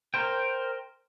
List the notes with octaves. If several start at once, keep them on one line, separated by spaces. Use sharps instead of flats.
A#4 C5 G5